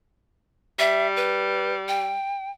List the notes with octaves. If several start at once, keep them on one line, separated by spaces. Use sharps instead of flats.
G3 E5
B4
G5